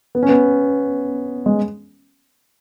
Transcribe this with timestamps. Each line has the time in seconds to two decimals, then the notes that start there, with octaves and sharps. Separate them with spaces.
0.15 B3
0.23 C#4
0.29 B3
1.46 G#3